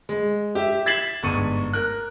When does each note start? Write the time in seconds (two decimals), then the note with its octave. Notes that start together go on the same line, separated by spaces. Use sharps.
0.09 G#3
0.55 G4 E5
0.86 G#6 A6 B6 C7 E7 F#7
1.23 G1 G#2 C#6 D#7
1.73 A#4 F#6